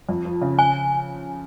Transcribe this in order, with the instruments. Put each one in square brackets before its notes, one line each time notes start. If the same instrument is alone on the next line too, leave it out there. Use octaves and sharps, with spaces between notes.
[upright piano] F2
F3
C#3
[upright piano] C#3 [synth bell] G#5